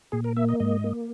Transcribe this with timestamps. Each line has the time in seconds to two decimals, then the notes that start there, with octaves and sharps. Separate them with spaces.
0.12 A#2 G#4
0.24 A#4
0.37 A#3 E5
0.49 D#5
0.60 G#2 D#5
0.84 A#3